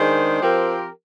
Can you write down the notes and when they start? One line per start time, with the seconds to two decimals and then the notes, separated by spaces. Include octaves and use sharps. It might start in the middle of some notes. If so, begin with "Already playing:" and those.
Already playing: D#3 G#3 D4 G#4 C5
0.40 F3 C4 G4 A#4